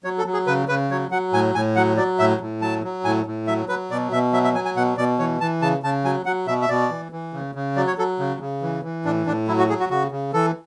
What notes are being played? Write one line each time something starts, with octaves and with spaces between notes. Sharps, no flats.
F#3 C#5
A4
F#3
G#4
C#3 B4
C#3 B4
F#3 C#5
F#3 F#5
A2 G#5
A2 G#5
F#3 F#5
F#3 D5
A2 E5
A2
F#3 A5
F#3
A2 G#5
A2
F#3 E5
F#3 B4
B2 D5
B2 E5
F#3 E5
E5
F#3 G#5
G#5
B2 F#5
B2 D5
E3 C#5
E3 A5
C#3 A5
C#3 A5
F#3 G#5
F#3 F#5
B2 E5
E5
B2 D5
E3
E3
C#3
C#3
F#3 D5
C#5
F#3 A4
C#3
C#3
E3
E3
A2 D4
A2 D4
F#3 E4
F#4
F#3 G#4
F#4
C#3 F#4
C#3
E3 A4